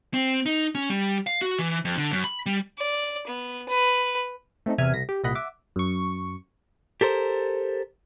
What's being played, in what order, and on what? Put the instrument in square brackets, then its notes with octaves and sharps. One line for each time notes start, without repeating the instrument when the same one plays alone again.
[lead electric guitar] C4
D#4
C#4
G3
F5
F#4
E3
F2
D3
F#2
B5
G3
[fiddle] D5
B3
B4
[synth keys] A3 C4 D#4 A4
E2 C3 E5 F6 G#6 D#7
C2 A#6 B6
G4
C2 A#2 D#5 F#5 B5
E5 F#5 D6
[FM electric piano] F#2 C#6
[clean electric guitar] G4 A4 A#4 C5